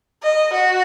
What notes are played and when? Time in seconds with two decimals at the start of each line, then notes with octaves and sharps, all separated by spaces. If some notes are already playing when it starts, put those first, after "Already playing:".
0.23 D#5
0.53 F#4